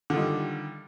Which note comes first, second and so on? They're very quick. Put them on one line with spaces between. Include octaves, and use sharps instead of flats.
D3 F4 D#3 G3